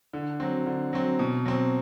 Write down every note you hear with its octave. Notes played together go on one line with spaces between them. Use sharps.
D3
F#3 C4
D3
F#3 C4
B2
F#3 C4